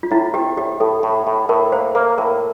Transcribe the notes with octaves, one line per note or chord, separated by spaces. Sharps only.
F4
A2 E4
C4 G4
A2 G4
A2 A4
A2
A2
A2 A#4
A#3 C5
A#3 A#4
A2 A#4